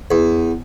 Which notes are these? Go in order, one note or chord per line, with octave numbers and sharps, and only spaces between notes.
E2